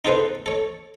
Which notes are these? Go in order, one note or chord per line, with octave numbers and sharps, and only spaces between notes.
D#4 F4 G#4 A4 B4 C5
A4 C#5